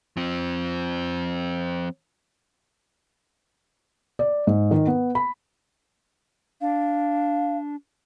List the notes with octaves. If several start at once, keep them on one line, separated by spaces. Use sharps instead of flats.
F3 C4
D5
G#2
D#3
B3
B5
D4 F5